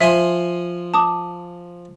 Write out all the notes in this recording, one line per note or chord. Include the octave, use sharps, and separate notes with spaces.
F3 E5 G#5 C6
A5 D6 D#6